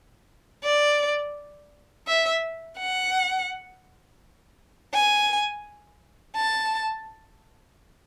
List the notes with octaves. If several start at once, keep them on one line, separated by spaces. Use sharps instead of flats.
D5
E5
F#5
G#5
A5